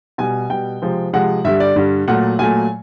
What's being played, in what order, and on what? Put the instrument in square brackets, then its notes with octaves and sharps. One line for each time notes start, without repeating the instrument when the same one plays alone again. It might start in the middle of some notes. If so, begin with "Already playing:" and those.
[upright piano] B2 G3 G#5
B2 G3 G5
C3 F3 G#3
C3 F3 G#3 F#5
G2 D3 G3 E5
D5
G2 D3 G3
A#2 F#3 A3 F#5
A#2 F#3 A3 G#5